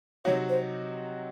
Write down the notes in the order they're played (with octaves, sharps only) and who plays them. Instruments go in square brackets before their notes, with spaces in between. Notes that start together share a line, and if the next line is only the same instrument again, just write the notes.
[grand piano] C3 F#3 C4 D#4 F#4 [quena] C#5
[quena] C5